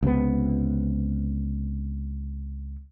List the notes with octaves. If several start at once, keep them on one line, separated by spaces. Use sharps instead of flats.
C#2 C3 B3